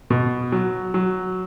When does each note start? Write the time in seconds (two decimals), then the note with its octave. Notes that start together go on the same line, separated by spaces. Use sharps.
0.10 B2
0.52 F#3
0.94 F#3